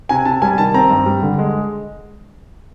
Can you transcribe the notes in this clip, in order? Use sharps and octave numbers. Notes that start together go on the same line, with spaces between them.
C3 G#5
C3 A5
G3 G#5
D#3 A5
C4 A#5
G2
G3
D3
G#3